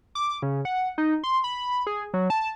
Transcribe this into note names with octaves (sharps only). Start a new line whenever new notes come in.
D6
C#3
F#5
D#4
C6
B5
G#4
F#3
A5